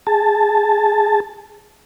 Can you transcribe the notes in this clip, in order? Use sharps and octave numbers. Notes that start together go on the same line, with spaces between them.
G#4 A5